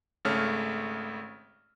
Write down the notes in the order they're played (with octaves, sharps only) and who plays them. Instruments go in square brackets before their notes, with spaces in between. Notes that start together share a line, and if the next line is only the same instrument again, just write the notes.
[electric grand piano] G#1 C#3 A3 C#5 F6